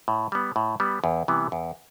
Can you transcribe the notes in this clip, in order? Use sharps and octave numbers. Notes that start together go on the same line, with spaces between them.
A2
G3 B3
A2
G3 B3
E2
C3 E3 G3 B3
E2